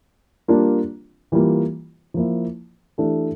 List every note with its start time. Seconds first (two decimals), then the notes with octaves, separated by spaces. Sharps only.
0.48 G3 A#3 D4 F4
1.32 E3 G3 A#3 F4
2.14 F3 A#3 E4
2.98 E3 A3 D4 G4